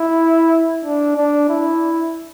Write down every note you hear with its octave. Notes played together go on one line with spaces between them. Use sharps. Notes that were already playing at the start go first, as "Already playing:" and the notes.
Already playing: E4
D4
D4
E4